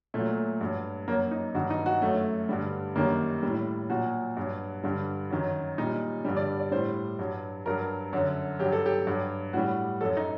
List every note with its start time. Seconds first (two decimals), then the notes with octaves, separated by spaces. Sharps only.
0.14 A#2 F#3 A3
0.61 G2 F#3
1.08 F#2 F#3 A#3
1.31 D#4
1.55 G2 D#3 F#3 F#4
1.70 D#4
1.86 F#4
2.02 F#2 F#3 A3
2.49 G2 D3 G3
2.96 F#2 D#3 G3 A#3
3.43 A2 G3
3.89 A#2 F#3 F#4
4.37 G2 F#3
4.84 G2 D3 G3
5.31 F#2 D#3 F#3
5.78 A#2 G3 D#4
6.25 G2 D3 G3
6.37 D5
6.60 D5
6.71 A2 G3 C5
7.19 G2 F#3
7.66 G2 F#3 A#4
8.13 F#2 D3 F#3
8.59 G2 F#3 G4
8.72 A4
8.86 G4
9.07 G2 F#3
9.53 A2 G3 F#4
10.01 F#3 A4
10.05 F#2
10.17 D#4